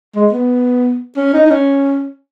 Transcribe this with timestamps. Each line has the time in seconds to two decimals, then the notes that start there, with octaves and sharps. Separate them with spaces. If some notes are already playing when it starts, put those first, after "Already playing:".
0.15 G#3
0.32 B3
1.16 C#4
1.33 D#4
1.46 D#4
1.50 C#4